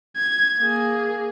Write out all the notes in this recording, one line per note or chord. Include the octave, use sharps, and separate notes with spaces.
G#6
A#3 G#4